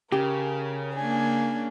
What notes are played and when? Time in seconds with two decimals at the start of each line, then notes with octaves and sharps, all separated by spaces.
0.12 C#3 G4 A#4
0.96 A#3 D4 G#5